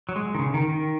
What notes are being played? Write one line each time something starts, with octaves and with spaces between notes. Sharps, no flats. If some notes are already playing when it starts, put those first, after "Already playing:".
F#3
G#3
D#3
C#3
D#3
D#3